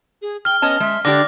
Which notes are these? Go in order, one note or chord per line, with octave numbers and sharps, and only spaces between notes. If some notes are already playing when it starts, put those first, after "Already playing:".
G#4
G5 F6 G7
B3 C#4 D#5 A5
G#3 E5
D3 D4 G4 D5 D6 A#6